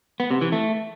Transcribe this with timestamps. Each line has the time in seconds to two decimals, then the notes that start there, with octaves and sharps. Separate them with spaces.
0.20 B3
0.31 C3
0.41 E3
0.52 A3